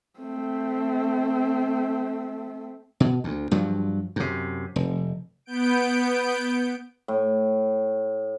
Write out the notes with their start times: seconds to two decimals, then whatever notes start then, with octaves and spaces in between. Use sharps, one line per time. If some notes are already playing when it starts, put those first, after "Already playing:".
0.20 A3 C4
3.00 B2
3.24 D2
3.51 G2 F3 F#3
4.16 F#2 C3
4.76 F1
5.46 B3 G6 D7
7.08 A2